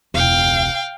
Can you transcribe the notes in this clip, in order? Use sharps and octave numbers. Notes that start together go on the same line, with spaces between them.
E1 C#2 F5 G5